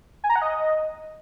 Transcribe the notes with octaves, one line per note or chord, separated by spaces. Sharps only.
G#5
A#5
F#5
D#5